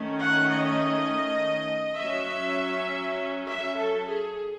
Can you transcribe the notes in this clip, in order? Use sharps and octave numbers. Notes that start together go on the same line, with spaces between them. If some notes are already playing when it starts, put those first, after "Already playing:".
Already playing: D#3 A3 C#4
F#5
D#5
F#3 C#4 E5
E5
A4
G#4